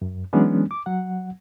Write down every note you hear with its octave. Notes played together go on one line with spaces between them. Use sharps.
F#2
E3 F#3 G#3 B3 C#4 D4
D6
F#3 F#5